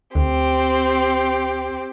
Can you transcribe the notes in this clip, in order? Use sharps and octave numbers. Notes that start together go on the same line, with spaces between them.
D2 C4 G4